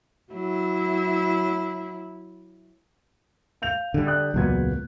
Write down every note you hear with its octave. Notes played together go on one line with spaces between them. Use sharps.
F#3 E4
F5 G6 F7
D3 G3
D#6 F#6
E1 C#2 A#2 F#3 B3 G#6